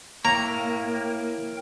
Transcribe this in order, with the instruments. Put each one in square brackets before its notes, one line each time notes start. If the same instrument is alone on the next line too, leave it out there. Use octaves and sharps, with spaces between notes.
[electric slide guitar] A#3 [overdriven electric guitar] E4 C#5 [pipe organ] A#4 G5 [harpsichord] A#5